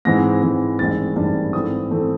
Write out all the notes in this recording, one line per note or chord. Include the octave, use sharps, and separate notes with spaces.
G#2 E3 G#3 C4 A#6
G#2 E3 G#3 C4
A1 G2 D#3 G#3 C4 A6
A1 G2 D#3 G#3 C4
G#2 E3 A3 C4 D#6
E3 A3 C4